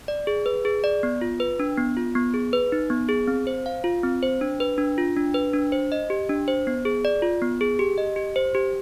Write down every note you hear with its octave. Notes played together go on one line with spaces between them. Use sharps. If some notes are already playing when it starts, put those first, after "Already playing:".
D5
G#4
B4
G#4
D5
B3
F4
B4
D4
B3
F4
B3
G#4
B4
D#4
B3
G#4
C4
C5
F5
F4
C4
C5
D4
B4
D4
F4
D4
B4
D4
C5
D#5
G4
D4
C5
B3
G#4
D5
F4
B3
G#4
G4
D#5
G4
C5
G4